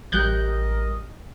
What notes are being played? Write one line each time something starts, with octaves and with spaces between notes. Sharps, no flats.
A1 G3 G4 A#4 D#5 F#6 G6